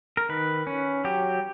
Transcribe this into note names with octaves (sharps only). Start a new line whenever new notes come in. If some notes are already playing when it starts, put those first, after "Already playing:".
A#4
D#3 B4
C#4
F#3 G4